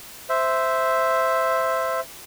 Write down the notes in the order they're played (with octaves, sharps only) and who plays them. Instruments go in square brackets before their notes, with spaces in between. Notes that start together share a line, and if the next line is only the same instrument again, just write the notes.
[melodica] C5 E5